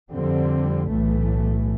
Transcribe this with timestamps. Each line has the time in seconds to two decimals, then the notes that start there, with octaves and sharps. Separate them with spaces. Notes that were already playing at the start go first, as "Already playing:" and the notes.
0.10 F2 D3 G3 C4
0.88 B1 A2 E3 A3